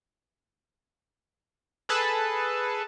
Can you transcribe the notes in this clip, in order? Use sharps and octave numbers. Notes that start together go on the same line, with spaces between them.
G#4 A4 B4 A5